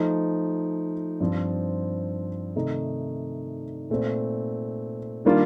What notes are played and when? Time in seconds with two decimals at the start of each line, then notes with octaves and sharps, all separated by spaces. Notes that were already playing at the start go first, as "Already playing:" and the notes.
Already playing: F3 A3 D#4
1.20 G2 F3 C4
2.56 C3 D#3 A3 D#4
3.90 A#2 A3 C4
5.25 D#3 G3 A#3 D4 F4